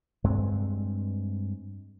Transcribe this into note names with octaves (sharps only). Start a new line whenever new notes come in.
G2 G#3 C4